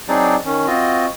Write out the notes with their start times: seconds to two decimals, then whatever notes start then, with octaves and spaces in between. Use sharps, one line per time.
0.08 F#3 C4 D4 D#4 G#4 D5
0.46 D#3 C#4
0.67 C4 F4 F#4 D#5